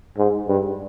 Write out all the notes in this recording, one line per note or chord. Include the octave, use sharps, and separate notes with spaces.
G#2
G2